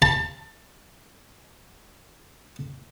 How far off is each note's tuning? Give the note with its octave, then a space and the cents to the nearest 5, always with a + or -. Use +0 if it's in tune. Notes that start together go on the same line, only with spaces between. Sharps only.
A5 +30